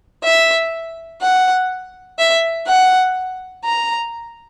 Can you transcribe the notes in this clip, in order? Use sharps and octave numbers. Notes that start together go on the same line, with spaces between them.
E5
F#5
E5
F#5
A#5